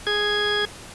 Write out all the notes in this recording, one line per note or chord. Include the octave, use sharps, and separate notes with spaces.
G#4 G#6